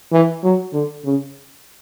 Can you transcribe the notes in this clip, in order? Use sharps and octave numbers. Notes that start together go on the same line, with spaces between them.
E3
F#3
D3
C#3